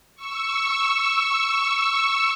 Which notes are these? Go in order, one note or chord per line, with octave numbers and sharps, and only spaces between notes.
C#6 E6